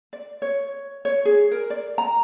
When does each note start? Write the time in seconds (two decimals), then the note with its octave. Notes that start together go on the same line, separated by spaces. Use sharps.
0.13 D5
0.42 C#5
1.05 C#5
1.25 G#4
1.51 A#4
1.70 D5
1.98 A#5